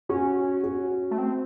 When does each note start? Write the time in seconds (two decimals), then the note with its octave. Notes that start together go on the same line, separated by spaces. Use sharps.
0.09 C#4 F#4
0.64 F#4
1.11 A3
1.18 C4